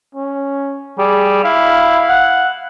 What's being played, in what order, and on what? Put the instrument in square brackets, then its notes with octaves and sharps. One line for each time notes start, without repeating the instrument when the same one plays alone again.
[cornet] C#4
[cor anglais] G3 [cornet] G#4
[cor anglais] E4 [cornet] F5
[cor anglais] F#5